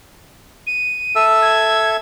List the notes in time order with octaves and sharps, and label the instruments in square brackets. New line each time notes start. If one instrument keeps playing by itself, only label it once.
[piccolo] D#7
[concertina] A4 E5 E6
[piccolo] G#6